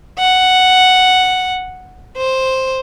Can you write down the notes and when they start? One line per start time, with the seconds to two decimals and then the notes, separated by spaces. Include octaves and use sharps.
0.19 F#5
2.17 C5